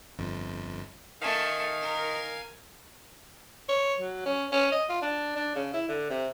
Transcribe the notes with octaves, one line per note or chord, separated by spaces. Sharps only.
G1 F2
D#3 A3 F5 G#5 C#6
A#4
C#5
F#3
C#4
C#4
D#5
F4
D4
D4
C#3
E4
D3
C3